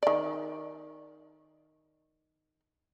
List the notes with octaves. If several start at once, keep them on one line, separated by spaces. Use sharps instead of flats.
D#3 D5